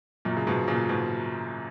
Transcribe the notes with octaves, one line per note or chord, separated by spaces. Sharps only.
F#2 A#2
C#3
G#2 B2
A#2 C#3
G#2 B2